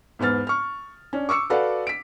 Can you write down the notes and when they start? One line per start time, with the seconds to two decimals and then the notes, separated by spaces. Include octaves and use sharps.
0.19 E2 G#2 B3 F6 A6
0.47 C#6 F6
1.13 C#4 D4
1.29 C#6 D6 E6 C#7
1.50 F#4 A4 B4 D5 F5 F#5
1.87 B6 D7